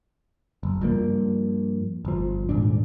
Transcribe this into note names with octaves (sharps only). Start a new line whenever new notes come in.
F#1
G2 F3 A#3
G1 F3
D#1 G#2 D4